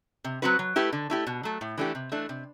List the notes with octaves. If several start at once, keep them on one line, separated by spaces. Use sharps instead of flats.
C3
F#3 C4 F#4 B4
F#3
A3 E4 G4 B4
D3
A3 E4 G4
B2
F#3 A3
A2
E3 A3 D4 G4
C3
E3 A3 D4
C3